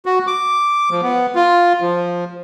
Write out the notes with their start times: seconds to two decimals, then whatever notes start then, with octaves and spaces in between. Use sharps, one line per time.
0.06 F#4
0.27 D6
0.91 F3
1.03 B3
1.35 F4
1.81 F3